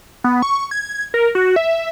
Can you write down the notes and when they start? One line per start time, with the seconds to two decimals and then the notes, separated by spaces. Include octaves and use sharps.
0.24 B3
0.42 C#6
0.71 G#6
1.14 A#4
1.35 F#4
1.56 E5